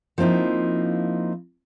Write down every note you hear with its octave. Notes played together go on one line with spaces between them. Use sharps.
F3 A#3 C4 D#4 E4